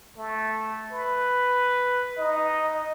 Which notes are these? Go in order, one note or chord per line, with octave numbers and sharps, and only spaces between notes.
A3
B4
D#4 D#5